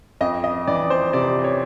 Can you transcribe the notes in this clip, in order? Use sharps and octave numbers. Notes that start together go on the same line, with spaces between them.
F2 D#5
D#5
E3 D5
C5
C3 D5
C#5